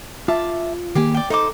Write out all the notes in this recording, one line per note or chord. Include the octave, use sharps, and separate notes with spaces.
F4 E5 A5 D6
D#3 A#3 G4 G#4 G#5
D5 G5
D#4 A4 C5 D6